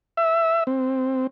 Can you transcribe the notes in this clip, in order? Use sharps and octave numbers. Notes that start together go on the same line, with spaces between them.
E5
C4